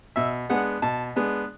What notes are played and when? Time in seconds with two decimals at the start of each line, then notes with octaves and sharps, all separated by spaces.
0.16 B2 E5
0.50 G#3 B3 D4 F#5
0.82 B2 A5
1.16 G#3 B3 D4